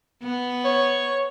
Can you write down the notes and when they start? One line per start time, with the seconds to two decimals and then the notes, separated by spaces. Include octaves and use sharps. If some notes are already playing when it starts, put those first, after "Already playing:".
0.23 B3
0.65 C#5